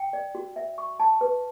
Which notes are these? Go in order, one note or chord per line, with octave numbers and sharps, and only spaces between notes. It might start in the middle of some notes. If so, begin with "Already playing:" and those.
Already playing: G5
D5
F#4
E5
C#6
A5
B4